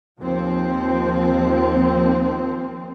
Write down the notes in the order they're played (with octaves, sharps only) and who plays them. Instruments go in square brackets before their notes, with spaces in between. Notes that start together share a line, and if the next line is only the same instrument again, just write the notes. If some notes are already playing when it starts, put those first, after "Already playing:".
[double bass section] D#2 F3 C4